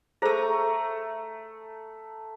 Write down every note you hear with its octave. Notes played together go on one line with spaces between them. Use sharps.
A3 G#4 A4 C5 A#5